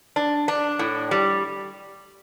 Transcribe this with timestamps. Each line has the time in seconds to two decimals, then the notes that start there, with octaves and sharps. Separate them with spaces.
0.16 D4
0.48 D4
0.79 A2
1.11 G3